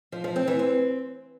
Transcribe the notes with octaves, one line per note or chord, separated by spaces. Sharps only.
F3
F3
C4
E3
C4